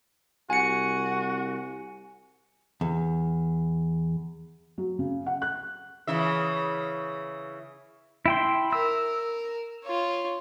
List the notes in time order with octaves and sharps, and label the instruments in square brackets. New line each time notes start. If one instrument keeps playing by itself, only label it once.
[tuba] C2 [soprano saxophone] F#4 [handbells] G#5 C#7
[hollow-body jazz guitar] E2
[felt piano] F#3
C#3
F#5
F#6
[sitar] C#3 E3 E5
[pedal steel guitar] E4 G5 C6
[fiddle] A#4 [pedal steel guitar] E6
[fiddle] F4 C#5